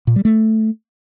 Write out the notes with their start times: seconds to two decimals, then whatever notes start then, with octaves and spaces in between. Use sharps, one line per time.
0.07 A#2
0.16 G3
0.25 A3